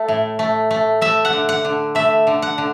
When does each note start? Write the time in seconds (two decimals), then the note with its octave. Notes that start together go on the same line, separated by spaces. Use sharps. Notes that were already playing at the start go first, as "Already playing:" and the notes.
Already playing: A3
0.08 A2
0.39 A3
0.71 A3
1.01 A3 E5
1.25 F#5
1.33 D3
1.49 F#5
1.65 D3
1.95 A3 E5
2.27 D3
2.42 F#5
2.58 D3